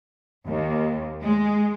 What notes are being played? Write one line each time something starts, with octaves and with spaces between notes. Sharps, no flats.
D#2
G#3